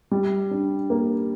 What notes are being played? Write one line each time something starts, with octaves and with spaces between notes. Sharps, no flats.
G3
D4
A#3